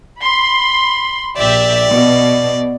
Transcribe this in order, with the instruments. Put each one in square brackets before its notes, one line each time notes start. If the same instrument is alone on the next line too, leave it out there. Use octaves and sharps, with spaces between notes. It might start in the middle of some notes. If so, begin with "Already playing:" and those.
[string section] B5 C6
[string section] A#1 G4 E5 [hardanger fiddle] D5
[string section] B2